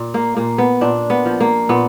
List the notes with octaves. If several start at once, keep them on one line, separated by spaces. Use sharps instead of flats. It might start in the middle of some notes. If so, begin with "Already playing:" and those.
Already playing: A#2
A#3
A#2 A#3
B3
A#2 D4
B3
F3
A#3
A#2 B3